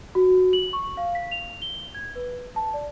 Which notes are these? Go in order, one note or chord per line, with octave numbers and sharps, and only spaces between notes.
F#4
F#7
C#6
F5
B6
F7
G7
G#6
B4
A5
D5